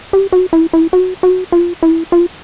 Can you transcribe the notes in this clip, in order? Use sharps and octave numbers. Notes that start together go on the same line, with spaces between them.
G4
F#4
E4
E4
F#4
F#4
F4
E4
F4